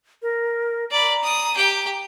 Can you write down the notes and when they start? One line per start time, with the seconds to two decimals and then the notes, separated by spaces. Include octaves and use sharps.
0.22 A#4
0.91 D5 A#5 B5
1.23 D#6
1.56 G4 G5